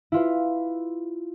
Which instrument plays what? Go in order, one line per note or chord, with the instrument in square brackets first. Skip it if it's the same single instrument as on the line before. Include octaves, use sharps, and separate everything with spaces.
[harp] E4 F4 B4